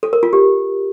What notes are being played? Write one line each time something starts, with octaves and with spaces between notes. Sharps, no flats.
A4
A#4
F4
G4